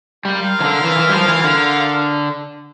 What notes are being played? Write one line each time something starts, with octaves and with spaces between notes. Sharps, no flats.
G3 F4 A#4 F5
E3
D3
E3
E3
G3
F3
E3
D3